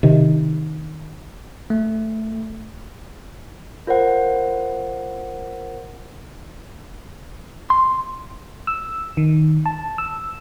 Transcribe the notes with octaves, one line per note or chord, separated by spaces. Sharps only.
C3 D#3
A3
F4 A#4 C5 F#5
C6
E6
D#3
A5
E6